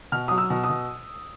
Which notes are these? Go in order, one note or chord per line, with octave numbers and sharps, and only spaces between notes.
B2 F6
F#3 D#6
E6
B2
D#6
B2